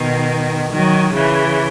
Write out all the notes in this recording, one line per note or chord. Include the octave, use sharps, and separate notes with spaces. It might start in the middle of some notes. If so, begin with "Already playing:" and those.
Already playing: B2 D#3
D#3 F#3
C#3 E3